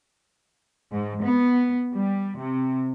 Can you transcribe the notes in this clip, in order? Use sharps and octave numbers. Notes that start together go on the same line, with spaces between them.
G#2
B3
G3
C3